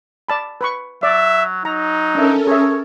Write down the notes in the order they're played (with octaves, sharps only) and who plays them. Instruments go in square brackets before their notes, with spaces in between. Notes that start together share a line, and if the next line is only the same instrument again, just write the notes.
[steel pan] D5 A5 B5
B4 B5 C#6
[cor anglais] F#3 [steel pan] D5 [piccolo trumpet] E5
[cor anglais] F#3 [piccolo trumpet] D#4 [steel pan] A#5
[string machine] C#4 A4 A#4 [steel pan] D4 E5
[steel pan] G#4 E5 [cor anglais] C#5